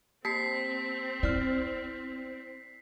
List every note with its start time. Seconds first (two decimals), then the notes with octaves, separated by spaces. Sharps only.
0.25 A#3 C4 G4 A5 B6 C7
1.23 E4 D5 F6